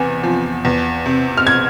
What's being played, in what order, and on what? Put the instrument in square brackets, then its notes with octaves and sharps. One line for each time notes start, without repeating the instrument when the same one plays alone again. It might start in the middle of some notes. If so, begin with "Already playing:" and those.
Already playing: [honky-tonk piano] E2 C3 B3 G#5
F3
E2
C3
F6
G#6